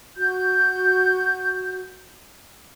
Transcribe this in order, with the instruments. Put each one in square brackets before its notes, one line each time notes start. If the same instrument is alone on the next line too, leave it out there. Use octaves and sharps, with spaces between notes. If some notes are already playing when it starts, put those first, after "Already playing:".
[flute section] F#4 G6